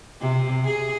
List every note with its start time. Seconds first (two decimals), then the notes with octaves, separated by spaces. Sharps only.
0.21 C3
0.65 G#4